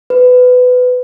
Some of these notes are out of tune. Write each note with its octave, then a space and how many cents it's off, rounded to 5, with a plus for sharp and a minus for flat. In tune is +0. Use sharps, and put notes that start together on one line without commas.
B4 +20